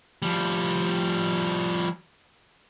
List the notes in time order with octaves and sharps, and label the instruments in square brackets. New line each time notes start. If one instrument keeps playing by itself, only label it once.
[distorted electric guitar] F3 G3